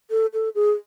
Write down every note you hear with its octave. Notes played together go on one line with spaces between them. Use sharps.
A4
A4
G#4